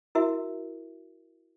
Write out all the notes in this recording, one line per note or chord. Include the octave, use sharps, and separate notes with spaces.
E4 F#4 A#4 E5